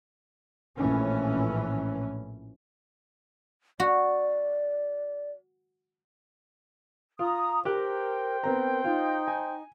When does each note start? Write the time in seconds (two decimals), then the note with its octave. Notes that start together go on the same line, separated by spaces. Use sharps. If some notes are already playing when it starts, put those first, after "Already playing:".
0.76 A#1 A2 E3 C#4
3.80 F#4 D5
7.19 F4 A#5 D#6
7.65 G4 A#4 C5 G5 F#6
8.44 B3 C4 A#4 A#5
8.84 D#4 F4
9.28 G#5